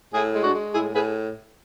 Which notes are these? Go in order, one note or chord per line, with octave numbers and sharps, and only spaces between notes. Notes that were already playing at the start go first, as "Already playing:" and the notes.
A2 E4 G#4
G#3
D4 F#4
G#3
A2 E4 G#4
A2 G#4 B4